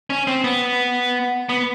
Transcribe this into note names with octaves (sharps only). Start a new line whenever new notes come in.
C#4
C4
B3
B3